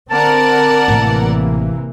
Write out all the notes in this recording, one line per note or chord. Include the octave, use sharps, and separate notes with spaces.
D3 C4 A#4 D5 F#5 A5
A1 C3 E3 A#3